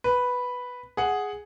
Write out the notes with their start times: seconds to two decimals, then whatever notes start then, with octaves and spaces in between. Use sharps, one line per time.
0.04 B4
0.97 G#4 F#5